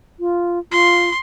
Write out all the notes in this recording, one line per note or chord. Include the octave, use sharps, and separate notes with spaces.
F4
F4 C6